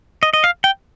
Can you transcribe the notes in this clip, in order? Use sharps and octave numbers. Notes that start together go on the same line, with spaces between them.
D#5
D#5
F5
G5